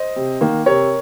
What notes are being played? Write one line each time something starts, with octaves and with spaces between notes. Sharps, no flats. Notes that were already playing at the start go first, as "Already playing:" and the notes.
Already playing: C5 D#5
C3
D#3 A#3
C3 A#4 C#5